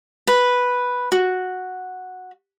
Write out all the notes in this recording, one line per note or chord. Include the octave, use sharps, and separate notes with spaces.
B4
F#4